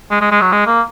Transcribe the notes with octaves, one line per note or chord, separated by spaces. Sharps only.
G#3
G#3
G#3
F#3
G#3
A#3